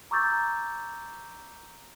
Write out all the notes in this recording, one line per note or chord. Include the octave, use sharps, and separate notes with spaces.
A#5 C#6 D6 E6 G6 A6